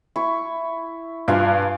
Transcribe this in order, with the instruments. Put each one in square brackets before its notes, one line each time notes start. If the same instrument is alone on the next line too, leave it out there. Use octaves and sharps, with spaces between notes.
[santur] E4 C#6
[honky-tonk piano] G2 F4 [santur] F5 G#5 C6